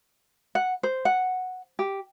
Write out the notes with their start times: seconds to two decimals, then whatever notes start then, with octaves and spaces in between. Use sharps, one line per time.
0.55 F#5
0.83 C5
1.05 F#5
1.79 G4